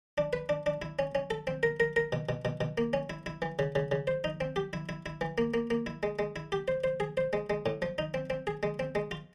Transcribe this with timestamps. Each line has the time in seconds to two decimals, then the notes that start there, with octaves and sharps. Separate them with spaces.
0.18 D4
0.33 B4
0.49 D4
0.66 D4
0.82 E4
0.99 C#4
1.15 C#4
1.30 A4
1.47 C4
1.63 A#4
1.80 A#4
1.96 A#4
2.12 B2
2.29 B2
2.45 B2
2.61 B2
2.78 A#3
2.93 C#4
3.10 E4
3.26 E4
3.42 E3
3.59 C#3
3.75 C#3
3.91 C#3
4.07 C5
4.24 D#4
4.41 C4
4.56 G4
4.73 E4
4.89 E4
5.06 E4
5.21 E3
5.38 A#3
5.54 A#3
5.70 A#3
5.86 E4
6.03 G#3
6.19 G#3
6.36 E4
6.52 G4
6.68 C5
6.84 C5
7.00 G#4
7.17 C5
7.33 G#3
7.50 G#3
7.66 A2
7.82 F3
7.98 D#4
8.14 C4
8.30 C4
8.47 G#4
8.63 G#3
8.79 C4
8.95 G#3
9.11 F4